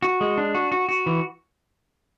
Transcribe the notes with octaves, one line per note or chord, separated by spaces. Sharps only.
F#4
G#3
D4
F#4
F#4
F#4
E3